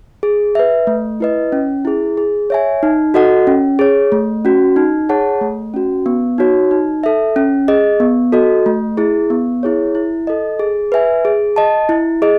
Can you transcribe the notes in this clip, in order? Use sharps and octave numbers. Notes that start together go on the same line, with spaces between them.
G#4
B4 E5
A3
E4 B4 D#5
C#4
E4 G#4
G#4
C#5 E5 G#5
D#4
F#4 A4 D#5 F#5
C#4
G#4 C#5
A3
C#4 F#4
D#4
G#4 C#5 F#5 A5
A3
C#4 F#4
B3
D#4 F#4 C#5
D#4
A4 E5
C#4
G#4 D#5
B3
F#4 A4 D#5
A3
E4 G#4
B3
E4 G#4 C#5
E4
A4 D#5
G#4
B4 E5 G#5
G#4
D#5 A5
E4
G#4 D#5